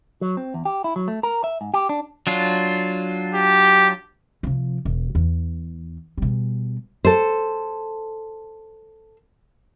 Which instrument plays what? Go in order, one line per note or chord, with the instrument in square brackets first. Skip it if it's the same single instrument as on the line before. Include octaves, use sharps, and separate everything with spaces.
[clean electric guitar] F#3
C4
E2
G4
E4
F#3
A3
A#4
E5
G#2
G4
D4
[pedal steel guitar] F#3 D4 F4
[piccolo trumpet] G4
[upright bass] C3 F3
E1
E2
B2 G3
[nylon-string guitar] A4 C5